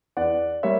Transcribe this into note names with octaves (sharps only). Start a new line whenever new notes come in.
E2 D5 F#5
G3 A#3 C#5 E5